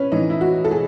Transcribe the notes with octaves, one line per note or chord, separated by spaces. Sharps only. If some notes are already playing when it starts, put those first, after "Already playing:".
Already playing: C#4 B4
A2 E3 D#4
E4
F#4
A4
G#4